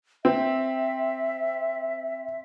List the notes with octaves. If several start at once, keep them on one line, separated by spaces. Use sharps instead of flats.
C4 E5